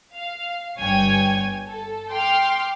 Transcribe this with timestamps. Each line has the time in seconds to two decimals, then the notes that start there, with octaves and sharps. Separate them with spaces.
0.14 F5
0.79 G1 G2 C#5 G5 G#5 G#6
1.66 A4
2.10 G5 C6 D6 F6